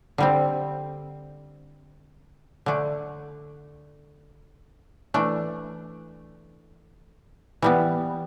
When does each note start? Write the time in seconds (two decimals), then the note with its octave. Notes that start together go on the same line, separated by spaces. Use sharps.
0.18 D3 G3 C4
2.66 D3 A3 D4
5.14 E3 A3 D4
7.62 E3 G3 B3